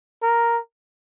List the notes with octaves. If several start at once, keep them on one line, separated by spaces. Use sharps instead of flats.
A#4